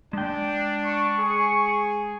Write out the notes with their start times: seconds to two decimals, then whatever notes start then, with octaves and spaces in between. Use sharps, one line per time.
0.13 G#3 D4 G5
0.84 C#6
1.19 G#4